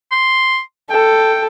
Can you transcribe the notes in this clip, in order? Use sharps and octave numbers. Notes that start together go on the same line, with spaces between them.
C6
A4 G5